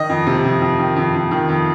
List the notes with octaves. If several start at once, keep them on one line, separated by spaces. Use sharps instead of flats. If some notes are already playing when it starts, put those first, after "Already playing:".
Already playing: D#3 D#5
F2
C3
F2
F2
D#3
F2
F2
D#3
F2